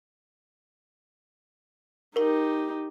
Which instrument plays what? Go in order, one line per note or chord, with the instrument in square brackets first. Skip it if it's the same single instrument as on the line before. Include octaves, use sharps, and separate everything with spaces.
[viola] D#4 G4 [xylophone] A#4 G7